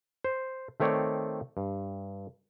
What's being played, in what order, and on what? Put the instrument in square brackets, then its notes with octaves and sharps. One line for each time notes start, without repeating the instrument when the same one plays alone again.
[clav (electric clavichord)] C5
D#3 A3 C4 C#5 D5
G2